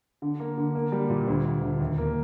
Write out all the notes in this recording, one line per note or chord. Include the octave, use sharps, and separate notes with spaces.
D3
A#3
D3
A#3
G3
A#2
D2
D2
D3
D#2
A#3